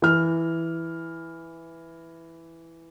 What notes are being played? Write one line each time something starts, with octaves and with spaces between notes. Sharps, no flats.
E3 F6